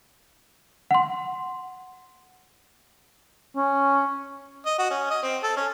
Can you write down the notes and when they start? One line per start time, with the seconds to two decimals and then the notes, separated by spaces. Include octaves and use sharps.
0.91 F#5 C6
3.56 C#4
4.66 D#5
4.78 F#4
4.91 C#4
5.11 D#5
5.23 C4
5.43 A4
5.56 C#4